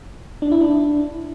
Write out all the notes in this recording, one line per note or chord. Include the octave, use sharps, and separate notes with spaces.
D4
E4
D4